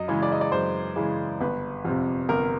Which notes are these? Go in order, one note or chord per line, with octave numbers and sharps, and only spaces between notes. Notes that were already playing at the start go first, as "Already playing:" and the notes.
Already playing: F#2 D#5
C#3 E3 G#3
D5
D#5
D5
F#2 C5
C#3 E3 G#3
G1 B4
F2 C3
G1 A#4